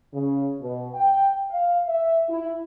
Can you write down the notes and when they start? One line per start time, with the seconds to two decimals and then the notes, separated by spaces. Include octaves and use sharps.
0.14 C#3
0.61 B2
0.94 G5
1.50 F5
1.88 E5
2.29 E4